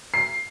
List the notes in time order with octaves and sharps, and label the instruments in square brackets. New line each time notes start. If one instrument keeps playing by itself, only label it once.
[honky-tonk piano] C7